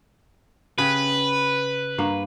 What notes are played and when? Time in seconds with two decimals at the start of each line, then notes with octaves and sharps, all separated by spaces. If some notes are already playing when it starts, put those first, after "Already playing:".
0.78 C#3 G4 B4
1.98 G2 A#3